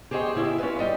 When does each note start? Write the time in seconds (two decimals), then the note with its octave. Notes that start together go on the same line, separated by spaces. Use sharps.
0.11 G4 G#4 C5 C#5 D#5 G5
0.35 C#3 E4
0.58 C#4 F4 B4
0.79 G3 D#5 G5